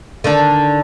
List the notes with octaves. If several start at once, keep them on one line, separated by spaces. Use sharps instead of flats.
D3 D#3 D4